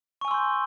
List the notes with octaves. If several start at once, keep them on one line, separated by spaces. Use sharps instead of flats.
G#5 C6 C#6 E6 G6